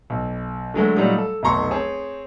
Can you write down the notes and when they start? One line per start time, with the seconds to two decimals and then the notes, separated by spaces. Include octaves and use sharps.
0.10 B1
0.74 D3 F#3 G#3 A3
0.96 A#2 F#3 G3 A3 D#4
1.18 A4
1.43 F1 B1 F#3 A#5 C6 C#6
1.71 C4 G#4 C#5 A5